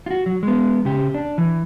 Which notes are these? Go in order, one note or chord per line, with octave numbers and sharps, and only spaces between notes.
F4 F#4
F#3
G#3 B3
C#3 G4
D4
E3